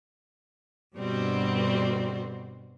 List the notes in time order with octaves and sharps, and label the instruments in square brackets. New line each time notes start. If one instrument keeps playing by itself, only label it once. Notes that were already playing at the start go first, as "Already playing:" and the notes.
[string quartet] G2 B2 D3 G3 C4 F#4